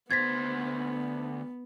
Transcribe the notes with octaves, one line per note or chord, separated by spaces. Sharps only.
D2 B3 C5 G#6 A6 B6